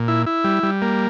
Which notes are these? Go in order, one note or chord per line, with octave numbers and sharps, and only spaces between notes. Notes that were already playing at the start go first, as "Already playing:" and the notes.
Already playing: A#2
E4
E4
G3
G3
A#3